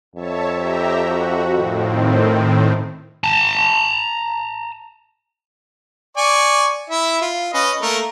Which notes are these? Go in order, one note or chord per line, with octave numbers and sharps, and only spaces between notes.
F2 C#5 E5 A5
G4 E5 A#5
F#4
A2 D#3 C4
A5 A#5
D5 G#5 C#6
E4 E5
F4
C#4 B4 D#5
A3 A#3 A#4